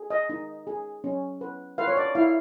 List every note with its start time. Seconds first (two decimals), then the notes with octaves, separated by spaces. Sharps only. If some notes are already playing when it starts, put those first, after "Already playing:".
Already playing: G#4
0.10 D#5
0.30 D#4
0.67 G#4
1.04 C#4
1.41 B4
1.78 B4 F5
1.88 C#5
1.97 D5
2.15 E4 F5